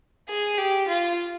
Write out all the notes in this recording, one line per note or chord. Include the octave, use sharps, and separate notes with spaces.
G#4
G4
F4